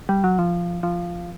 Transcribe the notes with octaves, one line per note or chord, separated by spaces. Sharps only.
G3
F#3
F3
F3